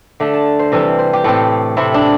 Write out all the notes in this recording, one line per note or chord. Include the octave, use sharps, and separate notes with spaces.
D3 A3 D4
A5
C5
C3 E3 G3 C4 A4
C5
G4
A2 A3 C4 A4
C3 A3 C4 E4
D4